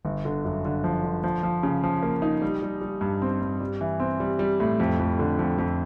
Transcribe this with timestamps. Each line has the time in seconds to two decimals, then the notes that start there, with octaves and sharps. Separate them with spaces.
0.05 G1
0.25 D3
0.45 F#2
0.65 D3
0.84 F3
1.04 D3
1.24 F3
1.43 F3
1.63 C#3
1.84 F3
2.03 A#3
2.22 D#4
2.42 G3
2.62 G3
2.81 G3
3.01 G2
3.22 C4
3.41 G2
3.60 G3
3.81 E3
4.00 C4
4.20 G3
4.39 G3
4.60 A2
4.80 F2
4.99 F2
5.19 D3
5.39 F2
5.58 F2